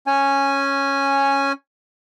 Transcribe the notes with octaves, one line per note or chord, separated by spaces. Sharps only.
C#4 G#5